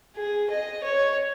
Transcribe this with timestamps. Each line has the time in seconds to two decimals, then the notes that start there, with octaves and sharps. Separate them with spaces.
0.17 G#4
0.50 D#5
0.84 C#5